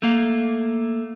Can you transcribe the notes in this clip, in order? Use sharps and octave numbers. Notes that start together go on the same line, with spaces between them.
A3 A#3 F5